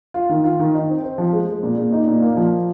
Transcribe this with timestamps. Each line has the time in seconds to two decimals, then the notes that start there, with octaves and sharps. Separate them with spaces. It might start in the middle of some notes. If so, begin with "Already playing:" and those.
0.14 F4
0.29 D#3
0.44 F4
0.59 D#3
0.75 D#4
0.89 C4
1.04 C4
1.18 F3
1.33 G#3
1.48 G#3
1.63 A#2
1.78 A#2
1.93 D#4
2.08 A#2
2.22 A#3
2.37 F3